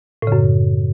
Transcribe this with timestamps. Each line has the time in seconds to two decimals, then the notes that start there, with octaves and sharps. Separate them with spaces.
0.22 A2
0.27 C#3
0.32 F#2